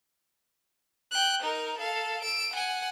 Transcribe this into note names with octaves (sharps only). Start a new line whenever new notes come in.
G5 F#6
D#4 A#4
A4 F5
E6 D7
F#5 G#5